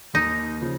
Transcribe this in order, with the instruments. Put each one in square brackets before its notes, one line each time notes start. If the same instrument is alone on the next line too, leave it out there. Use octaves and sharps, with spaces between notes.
[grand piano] D#2 [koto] D#4
[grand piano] C#3 F3